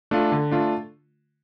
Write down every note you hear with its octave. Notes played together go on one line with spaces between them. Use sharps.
A3 D4 F4
D3
A3 D4 F4